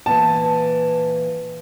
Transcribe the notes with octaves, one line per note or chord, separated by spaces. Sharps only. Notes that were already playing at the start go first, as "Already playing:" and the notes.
A#2 E3 A5